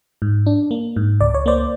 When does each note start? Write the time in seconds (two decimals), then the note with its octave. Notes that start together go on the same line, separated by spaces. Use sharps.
0.22 G#2
0.46 D4
0.71 A#3
0.96 G#2
1.21 C#2 D5
1.34 C#5
1.46 A#3 C5 D5